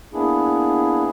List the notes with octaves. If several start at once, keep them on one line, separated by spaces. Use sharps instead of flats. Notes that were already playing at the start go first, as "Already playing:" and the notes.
A#3 B3 D4 E4 G#4